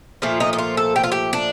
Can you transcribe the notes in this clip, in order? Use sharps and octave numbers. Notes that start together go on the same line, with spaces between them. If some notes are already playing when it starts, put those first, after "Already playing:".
A#2 F3 A3 F4
D#4
D#4
F4
A4
G4
F4
G4
D4